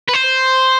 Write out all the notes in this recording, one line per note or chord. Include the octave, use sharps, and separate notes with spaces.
B4
C5